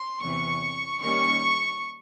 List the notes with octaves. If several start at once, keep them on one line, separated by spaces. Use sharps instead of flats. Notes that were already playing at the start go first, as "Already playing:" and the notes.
Already playing: C6
E2 C3 E3 C#6
D#3 G3 A#3 C#4 C#6